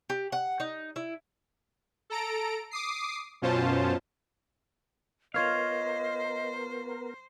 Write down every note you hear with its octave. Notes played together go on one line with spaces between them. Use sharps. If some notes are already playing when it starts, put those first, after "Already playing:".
G4
F#5
D#4
E4
A4 A#5 D7
D6 D#6 C7
F#2 B2 C#4 F4 C5 A5
B3 F4 A#4 C5 C#5 D#5 F5